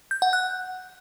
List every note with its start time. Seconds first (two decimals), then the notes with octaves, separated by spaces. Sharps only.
0.11 G6
0.22 F#5
0.33 F#6